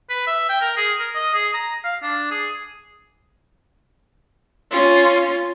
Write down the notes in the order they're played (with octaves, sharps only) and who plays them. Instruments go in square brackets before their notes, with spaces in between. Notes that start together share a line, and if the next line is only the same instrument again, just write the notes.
[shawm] B4
E5
G5
A#4
G#4
A#4
D#5
G#4
A#5
F5
D4
G#4
[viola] C#4 F4